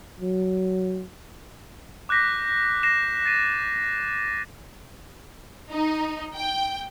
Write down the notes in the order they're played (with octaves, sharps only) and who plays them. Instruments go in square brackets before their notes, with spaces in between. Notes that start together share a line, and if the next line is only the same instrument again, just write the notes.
[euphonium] F#3
[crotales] D6 F#6 G6 A#6 B6
A#6 C7 E7
A6 C7 D#7
[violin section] D#4
G5